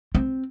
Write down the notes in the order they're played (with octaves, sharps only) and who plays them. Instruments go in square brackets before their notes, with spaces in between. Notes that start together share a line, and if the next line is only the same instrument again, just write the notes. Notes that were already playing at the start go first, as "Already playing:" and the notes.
[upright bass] C4